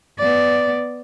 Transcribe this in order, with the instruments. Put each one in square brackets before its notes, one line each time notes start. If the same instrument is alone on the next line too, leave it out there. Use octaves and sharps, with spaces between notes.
[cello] B3 D5